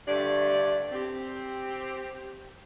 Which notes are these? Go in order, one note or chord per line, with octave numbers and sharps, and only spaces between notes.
G2 D3 A3 D5
C4 G4